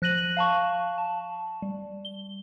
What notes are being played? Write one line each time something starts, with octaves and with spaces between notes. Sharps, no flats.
F3 F#6 A#6 D#7 F#7
F5 A5 C#6
A5
G3
G7